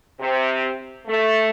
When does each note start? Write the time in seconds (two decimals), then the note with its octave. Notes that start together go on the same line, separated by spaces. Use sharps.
0.20 C3
1.06 A3